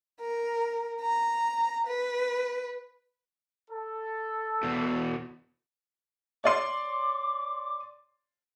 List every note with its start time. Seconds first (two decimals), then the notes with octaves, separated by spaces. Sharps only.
0.20 A#4
1.01 A#5
1.87 B4
3.71 A4
4.63 E2 B2
6.44 C#5 D5 C6 D6